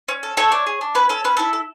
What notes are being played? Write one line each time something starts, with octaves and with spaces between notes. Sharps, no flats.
C#4
A4
A3 A4 C#5
D4
G#4
D4
C#4 B4
C#4 A4
C#4 B4
E4 A4
A4